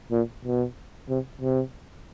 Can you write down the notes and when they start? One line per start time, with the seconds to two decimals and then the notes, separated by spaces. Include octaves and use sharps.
0.11 A#2
0.45 B2
1.09 C3
1.42 C3